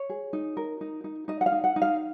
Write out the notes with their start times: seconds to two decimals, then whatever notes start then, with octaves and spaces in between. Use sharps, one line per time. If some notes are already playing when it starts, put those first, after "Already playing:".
Already playing: C#5
0.09 G#4
0.33 D#4
0.57 A#4
0.81 D#4
1.04 D#4
1.28 D#4 D#5
1.41 F#5
1.46 F5
1.52 D#4
1.64 F#5
1.76 D#4
1.82 F5